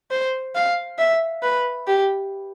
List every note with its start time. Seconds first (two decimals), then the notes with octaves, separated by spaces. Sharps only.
0.11 C5
0.55 F5
0.98 E5
1.43 B4
1.87 G4